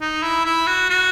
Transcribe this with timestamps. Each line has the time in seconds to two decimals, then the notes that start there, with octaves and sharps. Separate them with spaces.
0.01 D#4
0.23 E4
0.46 E4
0.67 F#4
0.90 F#4